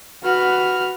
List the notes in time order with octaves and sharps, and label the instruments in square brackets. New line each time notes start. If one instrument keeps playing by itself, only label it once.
[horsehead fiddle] F#4 B4 [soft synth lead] F6